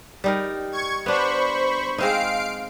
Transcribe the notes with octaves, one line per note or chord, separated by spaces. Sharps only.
G3 D#4 A#4
C#6 G#6
B3 D4 C5 B5 C#6
G#3 C4 D#4 F5 C7 D7